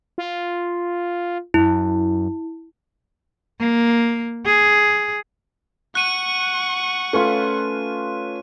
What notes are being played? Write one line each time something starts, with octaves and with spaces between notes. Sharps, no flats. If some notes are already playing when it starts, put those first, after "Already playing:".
F4
F#2 E4
A#3
G#4
F#5 C#6 F#6 D#7
A3 C#4 F4 B4